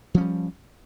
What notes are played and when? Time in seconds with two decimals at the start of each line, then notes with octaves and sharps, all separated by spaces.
0.14 F3
0.18 C#4
0.21 G3